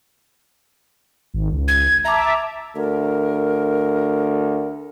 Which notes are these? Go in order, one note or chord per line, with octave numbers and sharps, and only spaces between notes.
G#1
C#2
G#6
E5 A5 A#5 D6
D2 A#4